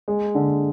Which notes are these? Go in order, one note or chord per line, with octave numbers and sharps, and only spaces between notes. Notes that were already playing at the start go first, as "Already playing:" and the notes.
G#3
D3